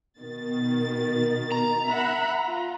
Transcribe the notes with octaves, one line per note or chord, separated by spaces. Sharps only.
B2 D#3 A6
A#5
E5 F#5 B5
F4